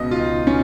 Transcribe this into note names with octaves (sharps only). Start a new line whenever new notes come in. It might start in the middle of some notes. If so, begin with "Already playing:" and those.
Already playing: C#2 B2 D#5
F4
C#2 D#4
B2 C#4